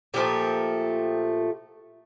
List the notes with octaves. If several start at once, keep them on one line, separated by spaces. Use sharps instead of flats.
A#2 F3 A3 G4